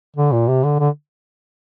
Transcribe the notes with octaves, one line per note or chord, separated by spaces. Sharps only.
D3
A#2
C3
D3
D3